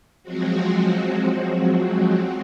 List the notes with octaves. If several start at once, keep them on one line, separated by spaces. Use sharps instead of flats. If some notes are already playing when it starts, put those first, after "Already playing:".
F3 F#3 G#3 C4 F#4